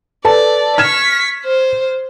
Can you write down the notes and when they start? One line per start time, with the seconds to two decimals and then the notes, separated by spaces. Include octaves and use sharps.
0.24 A4 B4 D5 A5
0.78 C#6 F6 G#6 B6 E7
1.45 C5